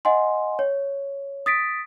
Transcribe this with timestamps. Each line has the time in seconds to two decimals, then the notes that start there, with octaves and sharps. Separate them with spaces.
0.05 D#5 F#5 G#5 C6
0.59 C#5
1.46 D#6 A6 B6 D7